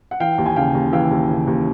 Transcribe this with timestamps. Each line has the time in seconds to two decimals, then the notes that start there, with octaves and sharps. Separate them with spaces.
0.11 F#5
0.20 E3 F5 G5
0.38 D#2
0.46 G#5
0.56 C#3 F5 G5
0.74 D#2
0.93 E3 F5 G5
1.11 D#2
1.29 C#3
1.47 D#2